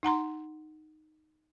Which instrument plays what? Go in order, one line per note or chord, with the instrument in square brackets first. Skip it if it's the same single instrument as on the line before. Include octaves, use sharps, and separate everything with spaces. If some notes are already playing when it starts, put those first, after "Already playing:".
[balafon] D#4 F#5 A#5 C6